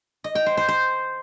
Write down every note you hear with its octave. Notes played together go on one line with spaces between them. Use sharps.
D#5
G5
C5
C5
C5